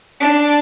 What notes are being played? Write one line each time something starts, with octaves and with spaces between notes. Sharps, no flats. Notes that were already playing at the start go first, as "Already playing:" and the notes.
D4